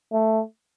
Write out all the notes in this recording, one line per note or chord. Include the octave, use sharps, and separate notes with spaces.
A3